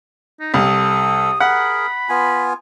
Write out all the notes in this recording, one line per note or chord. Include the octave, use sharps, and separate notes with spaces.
D#4
C2 A4 D#6
G#4 A#4 F#5 B5
B3 F4 G#5